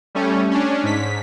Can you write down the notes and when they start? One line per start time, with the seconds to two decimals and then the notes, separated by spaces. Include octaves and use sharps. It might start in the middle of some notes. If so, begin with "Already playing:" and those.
0.15 G3 A3 C#4
0.51 C#4 D4
0.83 G#2 B6